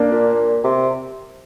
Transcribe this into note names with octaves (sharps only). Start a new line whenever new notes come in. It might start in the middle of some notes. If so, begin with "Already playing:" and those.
Already playing: A#3 D4
A#2
C3